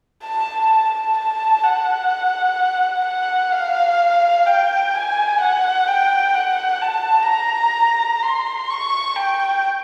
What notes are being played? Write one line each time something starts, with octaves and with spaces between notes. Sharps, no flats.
A5
A5
A5
F#5
F#5
F5
G5
G#5
F#5
G5
F#5
A5
A#5
C6
C#6
G5